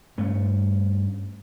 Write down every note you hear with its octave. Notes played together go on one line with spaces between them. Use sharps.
G2 A3 C#4